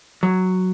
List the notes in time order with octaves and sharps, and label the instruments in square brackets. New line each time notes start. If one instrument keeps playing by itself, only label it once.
[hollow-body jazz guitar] F#3